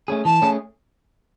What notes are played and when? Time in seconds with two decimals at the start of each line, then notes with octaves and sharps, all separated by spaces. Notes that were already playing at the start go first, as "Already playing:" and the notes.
0.08 A3 C#4 G#4
0.25 E3 A5
0.42 A3 C#4 G#4